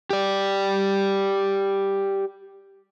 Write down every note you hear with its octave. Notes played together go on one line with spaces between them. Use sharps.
G4 D5